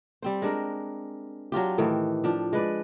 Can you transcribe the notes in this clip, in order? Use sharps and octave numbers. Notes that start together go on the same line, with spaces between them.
G3 C4 C5
G#3 D4 A#4
F#3 D4 F4 G4
A2 D#3 E3
F3 D4
G#3 B4 D5